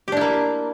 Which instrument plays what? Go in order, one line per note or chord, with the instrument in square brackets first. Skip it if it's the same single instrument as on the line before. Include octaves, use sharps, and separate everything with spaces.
[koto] G4
D4
E4
A#3